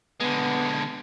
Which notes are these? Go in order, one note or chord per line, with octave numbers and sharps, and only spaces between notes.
D3 G#3 B3